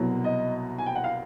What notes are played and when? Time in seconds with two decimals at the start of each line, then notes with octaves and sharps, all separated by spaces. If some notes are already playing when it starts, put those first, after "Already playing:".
Already playing: C2 B2 F#3
0.24 D#5
0.78 G#5
0.86 G5
0.95 F#5
1.04 F5